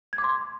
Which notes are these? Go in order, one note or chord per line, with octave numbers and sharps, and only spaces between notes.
G#6
D6
C6